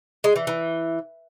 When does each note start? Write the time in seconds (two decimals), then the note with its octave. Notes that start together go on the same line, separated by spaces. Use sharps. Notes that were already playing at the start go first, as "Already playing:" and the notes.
0.24 G#3
0.36 E3
0.47 E3